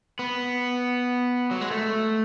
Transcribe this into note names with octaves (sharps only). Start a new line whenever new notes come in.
B3
F#3
G#3
A3